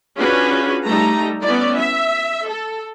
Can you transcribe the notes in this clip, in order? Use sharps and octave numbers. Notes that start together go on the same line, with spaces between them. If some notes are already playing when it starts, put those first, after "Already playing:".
C#4 D4 F4 F#4 G#4 B4
G3 A3 D#4 A4 A#5
B3 C#4 E4 D5
E5
A4